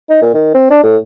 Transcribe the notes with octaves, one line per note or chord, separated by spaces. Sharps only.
D#4
A#2
D#3
C4
D4
A2